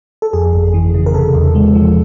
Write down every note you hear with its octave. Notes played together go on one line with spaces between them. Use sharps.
A4
F2 G#4
G1
E3
C#3
A#4
C3 A4
E2
G#3
F3